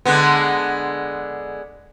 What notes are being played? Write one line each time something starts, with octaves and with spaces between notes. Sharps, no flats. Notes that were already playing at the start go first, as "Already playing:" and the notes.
D3 G#3 B3